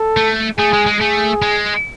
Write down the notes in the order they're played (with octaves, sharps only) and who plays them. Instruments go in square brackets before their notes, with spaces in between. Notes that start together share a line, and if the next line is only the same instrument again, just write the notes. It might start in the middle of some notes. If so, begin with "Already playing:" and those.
Already playing: [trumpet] A4
[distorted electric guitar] A3
[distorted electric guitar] A3 [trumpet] G#4
[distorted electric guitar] G#3
G#3
[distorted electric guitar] A3 [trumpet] G#4
[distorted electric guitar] G#3